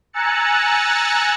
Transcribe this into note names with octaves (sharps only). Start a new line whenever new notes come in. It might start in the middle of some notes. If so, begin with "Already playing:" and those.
G#5 A#5 E6 F#6 A6 C#7